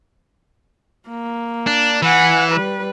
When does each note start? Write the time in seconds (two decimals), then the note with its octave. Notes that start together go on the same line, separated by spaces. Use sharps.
1.08 A#3
1.67 D4
2.02 E3 F#5 G#5
2.50 G3 B4